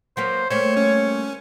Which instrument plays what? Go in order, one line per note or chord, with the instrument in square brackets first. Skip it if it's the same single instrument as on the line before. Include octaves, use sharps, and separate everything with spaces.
[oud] F#3 A#3 B4 [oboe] C5
[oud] G3 A3 A#3 [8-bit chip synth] C5 [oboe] C#5
[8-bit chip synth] C#4